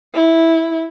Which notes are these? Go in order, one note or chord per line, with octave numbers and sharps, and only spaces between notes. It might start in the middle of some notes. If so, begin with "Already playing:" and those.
E4